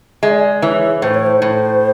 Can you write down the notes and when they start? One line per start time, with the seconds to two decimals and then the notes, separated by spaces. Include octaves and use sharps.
0.23 G#3 E5
0.28 D5
0.62 E3 C#5
1.02 A2 C5
1.15 C#5
1.26 C5
1.42 A2